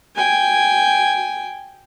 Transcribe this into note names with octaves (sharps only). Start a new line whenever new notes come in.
G5 G#5